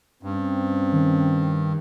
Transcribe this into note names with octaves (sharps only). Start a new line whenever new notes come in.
G2 C4 C#4
D#3